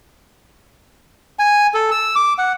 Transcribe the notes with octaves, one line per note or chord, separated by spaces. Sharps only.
G#5
A4
E6
D6
F#5